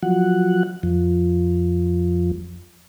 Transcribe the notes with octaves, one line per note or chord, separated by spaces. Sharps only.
F3 F#3 F#5
F2 F3